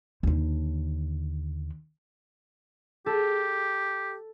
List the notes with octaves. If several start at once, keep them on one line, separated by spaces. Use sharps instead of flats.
D#2 D3
G4 A4